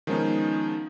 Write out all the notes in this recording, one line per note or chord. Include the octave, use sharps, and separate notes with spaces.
D#3 F3 G#3 B3 C#4 D#4